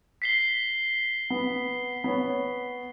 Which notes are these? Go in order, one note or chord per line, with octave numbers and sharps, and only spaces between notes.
B6 C7 G7
B3
B3 C#5